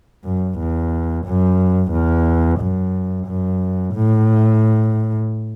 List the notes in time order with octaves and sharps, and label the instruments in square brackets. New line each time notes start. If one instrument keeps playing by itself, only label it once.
[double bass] F#2
E2
F#2
E2
F#2
F#2
A2